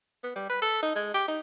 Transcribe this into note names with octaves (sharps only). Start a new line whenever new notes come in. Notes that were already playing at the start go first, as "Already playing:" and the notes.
B3
G3
B4
A4
D#4
G#3
G4
D#4